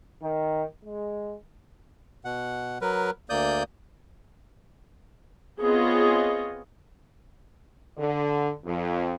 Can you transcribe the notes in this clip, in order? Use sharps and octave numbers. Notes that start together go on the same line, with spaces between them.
D#3
G#3
B2 F#5
F#3 A#4 B4
D2 A#3 D5 D#6 G6
B3 C4 F4 G#4 C#5 D#5
D3
F2